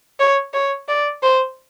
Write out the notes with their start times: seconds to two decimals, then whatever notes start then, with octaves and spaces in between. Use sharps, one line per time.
0.20 C#5
0.54 C#5
0.89 D5
1.23 C5